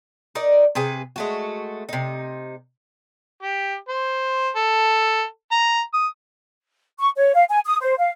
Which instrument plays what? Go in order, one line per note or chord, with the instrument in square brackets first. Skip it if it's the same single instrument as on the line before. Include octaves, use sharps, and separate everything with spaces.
[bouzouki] D#4 A#4 D5
C3 G#4 B4 G#5
G#3 A3 F#4
C3 D#4
[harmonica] G4
C5
A4
A#5
D#6
[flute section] C#6
C#5
F5
G#5
D#6
C5
F5